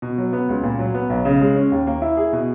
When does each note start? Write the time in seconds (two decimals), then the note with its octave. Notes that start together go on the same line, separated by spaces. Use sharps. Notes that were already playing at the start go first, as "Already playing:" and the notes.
0.02 B2
0.18 F#3
0.33 B3
0.49 C#2
0.63 A#2
0.79 F#3
0.94 B3
1.09 B1
1.25 C#3
1.41 G#3
1.56 C#4
1.71 D#2
1.87 A#3
2.02 E4
2.17 G#4
2.33 B2